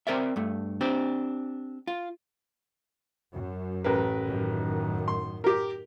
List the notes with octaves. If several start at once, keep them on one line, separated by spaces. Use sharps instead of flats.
C4 A#4 D5 E5
G2 A3
C4 D4 G4
F4
F#2
A1 A#4 B4
F#2 A2 D#3
C6
G4 A#4